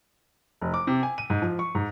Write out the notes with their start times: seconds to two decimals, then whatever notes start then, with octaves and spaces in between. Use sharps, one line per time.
0.61 F1
0.74 D6
0.87 C3
1.03 G#5
1.18 D#7
1.30 G#2
1.42 F3
1.59 C#6
1.75 G#2